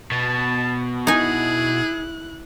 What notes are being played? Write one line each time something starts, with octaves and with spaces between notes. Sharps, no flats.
B2 A5
D#4 E4 G#4 G#5 F#6